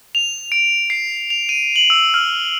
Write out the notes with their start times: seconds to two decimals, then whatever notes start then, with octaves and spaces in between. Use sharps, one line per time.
0.15 F7
0.52 D7
0.90 C7
1.30 F7
1.49 D#7
1.76 F#7
1.90 E6
2.14 F6